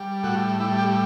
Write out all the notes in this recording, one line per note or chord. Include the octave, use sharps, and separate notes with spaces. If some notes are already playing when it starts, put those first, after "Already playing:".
Already playing: G3
A2 F#4
G3 E4
G4